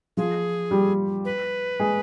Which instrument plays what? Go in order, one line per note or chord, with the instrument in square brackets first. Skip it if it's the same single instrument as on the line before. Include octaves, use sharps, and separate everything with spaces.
[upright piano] F3 F4 [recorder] G#4
[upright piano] G3 G4
[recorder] B4
[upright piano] G#3 G#4